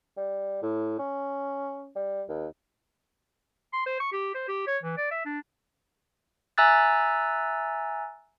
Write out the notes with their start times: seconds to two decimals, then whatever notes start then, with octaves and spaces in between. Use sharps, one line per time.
0.17 G3
0.62 A2
0.99 C#4
1.96 G3
2.29 D#2
3.73 C6
3.86 C5
4.00 C#6
4.13 G4
4.35 C5
4.48 G4
4.67 C#5
4.83 E3
4.97 D5
5.11 E5
5.25 D4
6.58 E5 G#5 A#5 E6 F#6 A6